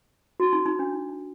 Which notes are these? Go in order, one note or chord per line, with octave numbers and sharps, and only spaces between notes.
F#4
D#4
D#4
D4
D#4
D#4